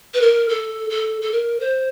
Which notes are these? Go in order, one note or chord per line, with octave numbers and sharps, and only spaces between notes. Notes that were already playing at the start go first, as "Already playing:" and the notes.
B4
A#4
A4
A4
A4
A#4
C5